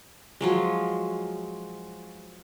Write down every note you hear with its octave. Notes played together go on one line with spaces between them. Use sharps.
F3 F#3 G#3